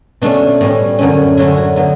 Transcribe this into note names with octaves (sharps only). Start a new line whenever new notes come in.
B2 A3 C#4 D4
A2 G3 C#4
F#2 D3 A3 C#4
D3 F#3 A3 C#4 E4
F#4
D3 F#3 B3